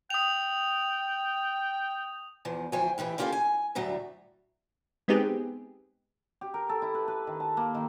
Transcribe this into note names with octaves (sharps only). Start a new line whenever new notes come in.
G5 D#6 F7
E2 E3 F3
D2 E3 F3 C5 G5 G#5
F2 A2 E3 G4
A#3 C#4 F4 G4 A4 F5
G#5
D2 A2 F#3 G3 E5
G#3 B3 C4 D#4 G4 G#4
G4
A#4
A4
E4
B4
B4
D#3
A5
A#3
D#3